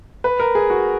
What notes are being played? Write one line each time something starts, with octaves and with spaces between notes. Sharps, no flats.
B4
A#4
G#4
F#4